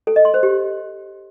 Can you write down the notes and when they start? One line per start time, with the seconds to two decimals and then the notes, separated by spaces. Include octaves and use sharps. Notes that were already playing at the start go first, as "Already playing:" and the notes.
0.07 A4
0.16 D#5
0.25 C6
0.34 C5
0.43 G4